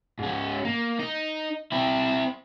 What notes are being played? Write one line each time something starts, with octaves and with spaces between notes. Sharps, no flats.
G#2 C#4
A#3
D#4
C4 E4